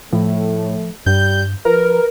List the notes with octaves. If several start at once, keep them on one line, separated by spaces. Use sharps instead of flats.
A2 F3 A3
G2 G3 G6
F3 A#4 B4